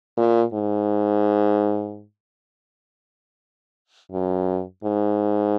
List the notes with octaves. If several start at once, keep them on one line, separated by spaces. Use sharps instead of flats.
A#2
G#2
F#2
G#2